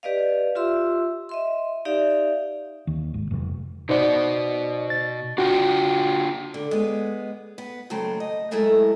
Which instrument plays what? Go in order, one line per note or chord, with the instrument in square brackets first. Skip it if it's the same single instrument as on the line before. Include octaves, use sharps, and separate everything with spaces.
[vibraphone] G4 B4 D5 D#5 F5
F4 G4 E5 C6 E6
D#5 E5 C6
D#4 G4 D5 E5 F5
[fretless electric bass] D#2
G#1
F1
[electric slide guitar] B2 F#4 [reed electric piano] D#4 C5 D5
[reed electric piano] A6
[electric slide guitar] D4 F4 G5 [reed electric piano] F#4
[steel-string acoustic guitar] D3
G#3 B3
B3
D#2 C#3 F#3 A3 C5 G5
D#5
F#3 G#3 A3 E4 A4 A#4